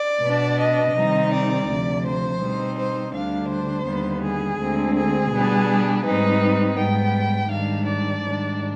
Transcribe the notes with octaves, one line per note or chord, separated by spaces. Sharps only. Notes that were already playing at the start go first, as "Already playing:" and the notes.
Already playing: D5
B2 B3 D4
D#5
C3 D#3 G3 C4 D#4
D5
D2 C3 F3
C5
B2 G3 C4 D#4
C5
D2 D3 G3 D4 F5
C5
D#2 D3 G3 B3
G#4
D2 D3 G#3 C4
G#4
B2 G3 B3 D4
G#2 G3 C4 D#4 B4
G#2 G3 B3 G5
G#2 D#3 G3 D4 F5
D5
G#2 D#3 G3 D4